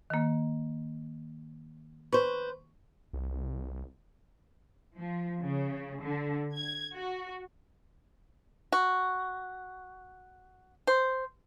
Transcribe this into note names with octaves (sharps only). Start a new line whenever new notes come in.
D#3 A#3
B4 C5 C#6
C2
F3
C#3
D3
G#6
F#4
F#4
C5